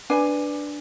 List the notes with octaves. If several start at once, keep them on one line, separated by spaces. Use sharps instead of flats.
D4 B4 G#5